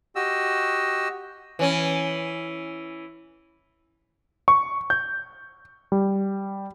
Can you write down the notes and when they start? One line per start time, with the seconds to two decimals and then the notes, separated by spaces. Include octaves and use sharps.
0.16 F#4 G4 D#5 E6
1.59 E3 C#4
4.48 C#6
4.90 G6
5.92 G3